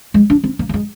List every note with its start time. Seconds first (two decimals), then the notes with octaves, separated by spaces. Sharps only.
0.14 G#3
0.30 D4
0.44 C4
0.59 A#3
0.69 A#3
0.74 G#3